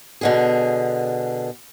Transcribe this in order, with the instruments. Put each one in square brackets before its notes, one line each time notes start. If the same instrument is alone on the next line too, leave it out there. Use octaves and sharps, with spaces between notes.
[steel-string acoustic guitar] B2 D3 G#4